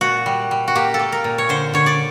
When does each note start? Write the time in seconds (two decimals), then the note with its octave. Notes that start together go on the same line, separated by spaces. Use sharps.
0.01 A#2 F#4
0.26 G3
0.51 G3
0.68 F#4
0.75 A#3 G4
0.94 A4
0.99 A#3
1.12 A#4
1.24 A#2
1.38 C#5
1.49 D3 C5
1.74 D3 C#5
1.86 D5